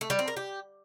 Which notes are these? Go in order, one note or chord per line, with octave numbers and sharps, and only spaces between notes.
A3
G3
C4
A#4
G4